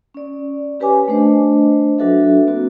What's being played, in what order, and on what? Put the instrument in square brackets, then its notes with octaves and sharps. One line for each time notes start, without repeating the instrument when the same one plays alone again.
[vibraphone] C#4 D5
C#4 G4 B4 C#5 G#5 D6
A3 D4 C5 D#5
F#3 D4 F#4 A4 B4 E5
A#3 C4 F#4 B4